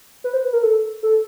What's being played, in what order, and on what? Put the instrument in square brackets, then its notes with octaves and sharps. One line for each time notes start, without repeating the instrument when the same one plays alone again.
[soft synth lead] B4
C5
B4
A#4
A4
A4